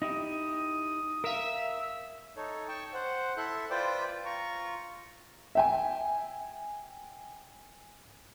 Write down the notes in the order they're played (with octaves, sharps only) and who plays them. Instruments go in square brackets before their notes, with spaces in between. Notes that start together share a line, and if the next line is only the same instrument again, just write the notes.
[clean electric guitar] D#4 E4 G4 [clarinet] D#6
[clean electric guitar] A#4 F5 [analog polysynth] E5
[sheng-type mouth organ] D#4 A4 C#5
G5 A5 C#6
C5 F#5
E4 A4 E5 C6 F#6
F4 B4 C5 D5 G5 D6
F4 A#5 C#6
[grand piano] E5 G5 G#5